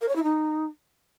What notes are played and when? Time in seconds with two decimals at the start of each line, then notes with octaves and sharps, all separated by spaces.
0.01 A#4
0.08 C#5
0.15 E4
0.23 D#4